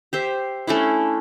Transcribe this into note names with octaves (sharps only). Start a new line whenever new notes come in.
G4 C5 E5
A3 C#4 D4 E4